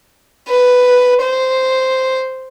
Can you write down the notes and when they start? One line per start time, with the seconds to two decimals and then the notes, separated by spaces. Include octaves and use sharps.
0.48 B4
1.21 C5